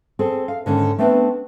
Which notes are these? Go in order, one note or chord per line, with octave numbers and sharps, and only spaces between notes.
C4 G#4 A4 C5
F5
G#2 D3 D#3 A#3 C#4
A3 B3 C4 D4 A#4 B4